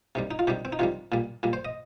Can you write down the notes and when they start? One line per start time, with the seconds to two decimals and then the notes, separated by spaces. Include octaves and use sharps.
0.15 C3 D#3 G3
0.31 D#4
0.39 F4
0.47 C3 D#3 G3 G4
0.65 C4
0.72 D#4
0.79 C3 D#3 G3 F4
1.12 A#2 G3
1.43 A#2 G3
1.53 C5
1.65 D#5